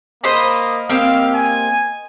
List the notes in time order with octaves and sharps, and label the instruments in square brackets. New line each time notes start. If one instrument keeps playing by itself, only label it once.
[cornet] A#3 [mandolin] C5 D#5 B5
[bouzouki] A#3 C4 G4 [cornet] F5
[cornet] G#5